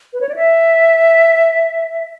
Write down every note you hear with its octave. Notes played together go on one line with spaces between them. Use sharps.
B4
C#5
D5
E5